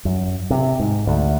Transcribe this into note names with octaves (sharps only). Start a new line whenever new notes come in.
F#2
C3
G#2
D2